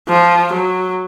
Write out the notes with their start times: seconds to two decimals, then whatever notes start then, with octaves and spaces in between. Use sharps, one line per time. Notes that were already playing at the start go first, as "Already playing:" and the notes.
0.08 F3
0.52 F#3